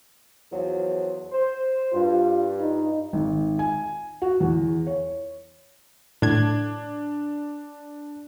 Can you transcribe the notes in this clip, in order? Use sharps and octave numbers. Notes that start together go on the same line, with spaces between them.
E2 F3 F#3
C5
G2 F4
D#4
G#1
G#5
F#4
E2
C#5
A2 D4 G#6